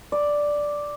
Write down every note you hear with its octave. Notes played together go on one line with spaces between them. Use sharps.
D5